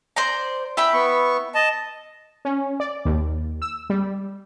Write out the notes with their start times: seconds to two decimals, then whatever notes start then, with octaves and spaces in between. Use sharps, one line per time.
0.16 C5 D5 A#5
0.77 E4 G5 B5
0.94 B3 C#6
1.55 D#5 A5
2.45 C#4
2.80 D5
3.05 D#2
3.62 E6
3.90 G3